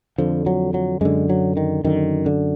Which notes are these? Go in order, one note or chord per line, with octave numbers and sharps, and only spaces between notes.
F2 D3 F3
F#3
F#3
F#2 D3 G#3
F#3
D#3
F#2 D3 D#3
D3